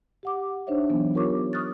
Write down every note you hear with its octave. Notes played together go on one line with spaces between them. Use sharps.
G4 F#5 D6
D4 D#4 C5 C#5 E5
E3 F#3 B3
F4 G4 A#4 C#5 C#6 D6
C#6 D#6 F6 F#6 A6